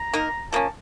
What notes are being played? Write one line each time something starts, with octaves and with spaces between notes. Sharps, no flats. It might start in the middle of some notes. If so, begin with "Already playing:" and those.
Already playing: A#5
A#3 D#4 A#4
F3 A#3 C#4 A5